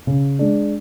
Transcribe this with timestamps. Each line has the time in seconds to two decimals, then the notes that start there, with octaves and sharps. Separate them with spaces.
0.07 C#3
0.39 G#3 D4